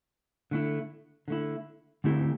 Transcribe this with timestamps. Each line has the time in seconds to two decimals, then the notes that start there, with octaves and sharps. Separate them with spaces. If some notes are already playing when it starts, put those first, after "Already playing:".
0.51 D3 A3 E4
1.28 D3 A3 E4
2.04 D3 A3 C4 E4 G4